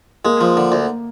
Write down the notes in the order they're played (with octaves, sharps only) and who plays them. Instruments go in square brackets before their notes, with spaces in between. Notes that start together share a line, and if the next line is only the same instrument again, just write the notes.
[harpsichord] G#3 [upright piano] A#3
[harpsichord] F3
D3
D2